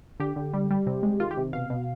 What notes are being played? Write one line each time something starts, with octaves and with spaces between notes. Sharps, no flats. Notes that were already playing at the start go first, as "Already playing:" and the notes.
D3 G4
D3
G3
G3
C3
G#3
D#3 F4
G4
C3
B2 F5
B2